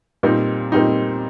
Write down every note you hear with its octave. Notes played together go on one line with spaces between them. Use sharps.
A#2 G3 C4 D#4
A#2 G3 C4 D#4